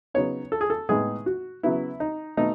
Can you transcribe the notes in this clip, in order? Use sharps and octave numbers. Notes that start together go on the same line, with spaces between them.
C#3 F#3 B3 D#4 C#5
A4
G#4
A4
A2 G#3 B3 D#4 G#4
F#4
C#3 F#3 B3 E4
D#4
B2 A3 D#4